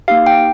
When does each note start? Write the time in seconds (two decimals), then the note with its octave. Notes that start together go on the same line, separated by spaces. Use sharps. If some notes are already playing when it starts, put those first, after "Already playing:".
0.08 A#3 D#4 G4 F5
0.26 G5